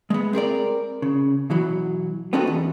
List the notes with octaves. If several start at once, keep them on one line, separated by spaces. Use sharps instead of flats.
G#3 B3
C4 G#4 A#4 D5
C#3
B2 E3 F#3
B3 C4 D4 D#4 F#4 A4
E2